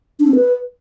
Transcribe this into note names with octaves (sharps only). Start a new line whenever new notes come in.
D4
C4
B4